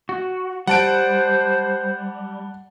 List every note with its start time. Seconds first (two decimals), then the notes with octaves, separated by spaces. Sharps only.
0.09 F#4
0.67 G3 C5 F#5 A5 D7